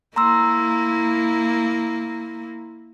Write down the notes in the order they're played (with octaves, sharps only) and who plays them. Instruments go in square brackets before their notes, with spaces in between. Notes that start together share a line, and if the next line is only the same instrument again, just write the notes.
[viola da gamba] A#3 E4 [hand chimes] A#5 C6 E6